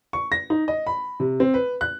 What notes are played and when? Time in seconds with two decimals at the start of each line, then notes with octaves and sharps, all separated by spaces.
0.13 C#6
0.32 A#6
0.50 D#4
0.68 D#5
0.87 B5
1.20 C3
1.40 C4
1.54 B4
1.81 F#6